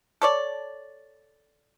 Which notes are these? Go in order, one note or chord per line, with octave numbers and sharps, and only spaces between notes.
A4 C#5 D5